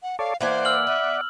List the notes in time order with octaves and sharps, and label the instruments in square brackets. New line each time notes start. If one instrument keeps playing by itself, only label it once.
[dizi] F#5
[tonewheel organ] A4 C#5 D5 [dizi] F5
[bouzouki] E3 A#3 G#5 [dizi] C5 [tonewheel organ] D5 F#5
[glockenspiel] E6 F6 F#7
[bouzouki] B3 [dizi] E5